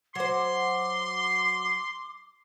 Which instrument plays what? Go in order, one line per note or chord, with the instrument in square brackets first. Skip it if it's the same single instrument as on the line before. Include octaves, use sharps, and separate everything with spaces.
[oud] F#3 C5 [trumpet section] C6 [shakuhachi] D6